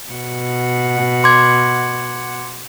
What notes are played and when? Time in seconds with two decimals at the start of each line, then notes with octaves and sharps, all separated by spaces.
0.12 B2 F#5
1.24 C6 D6 G#6